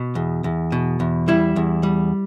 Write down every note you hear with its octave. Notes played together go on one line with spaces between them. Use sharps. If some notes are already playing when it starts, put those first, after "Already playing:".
Already playing: B2
E2
E2
B2
E2
G3 E4
E2
G3